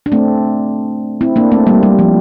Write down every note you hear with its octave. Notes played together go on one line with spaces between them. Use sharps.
D4
A3 C4
C4 E4
A#3 D4
A3 C4
G3 A#3
G3
F3